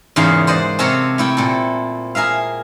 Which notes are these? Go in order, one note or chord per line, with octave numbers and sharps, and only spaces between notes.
E2 G#2 C#3 A#3 F5 C6
C5 D5 D#5 F#5
C3 C4 A4 A#4 C#5
A3 E4 G5
A#2 A4
G#4 A#4 E5 F5